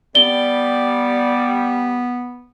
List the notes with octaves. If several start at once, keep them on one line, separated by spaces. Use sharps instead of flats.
G3 B3 D5 G7